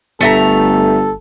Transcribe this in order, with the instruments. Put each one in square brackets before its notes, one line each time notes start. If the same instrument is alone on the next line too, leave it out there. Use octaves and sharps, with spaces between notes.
[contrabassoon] G1 [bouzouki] A3 E5 A#5 [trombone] A4